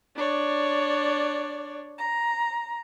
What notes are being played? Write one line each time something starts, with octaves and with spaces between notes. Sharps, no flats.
D4 C#5 D5
A#5